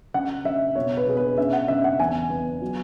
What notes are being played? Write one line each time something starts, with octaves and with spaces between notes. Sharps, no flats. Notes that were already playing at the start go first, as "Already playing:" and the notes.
C#3 F#5
C#3 E5
B2 C#5
B4
B2 G#4
B4
C#4 E5
F#5
C#3 E5
F#5
E2 G#5
B3
F#3